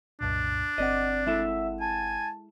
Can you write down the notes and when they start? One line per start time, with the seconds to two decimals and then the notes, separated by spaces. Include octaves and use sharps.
0.21 C2 F#2 A#2 D4
0.78 G1 C4 D5 D#5 F#5
1.27 G#3 E4 A4 E5
1.80 G#5 A5